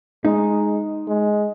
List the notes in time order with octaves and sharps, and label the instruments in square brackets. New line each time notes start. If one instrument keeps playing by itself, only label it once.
[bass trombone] G#3 [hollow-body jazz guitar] D#4
[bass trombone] G#3